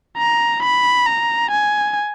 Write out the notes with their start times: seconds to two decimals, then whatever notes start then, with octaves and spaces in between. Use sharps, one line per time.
0.18 A#5
0.63 B5
1.06 A#5
1.51 G#5